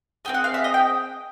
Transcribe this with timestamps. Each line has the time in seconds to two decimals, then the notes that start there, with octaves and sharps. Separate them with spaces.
0.25 C4 E4 G#4 G5
0.34 F#5
0.44 F5
0.54 E5
0.64 D#5
0.74 G5